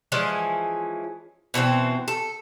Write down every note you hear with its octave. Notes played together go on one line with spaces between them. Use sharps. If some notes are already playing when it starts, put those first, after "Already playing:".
E3 F3 G#3 C#4
B2 E3 A#3 C4
A4